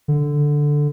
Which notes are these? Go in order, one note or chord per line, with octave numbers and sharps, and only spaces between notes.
D3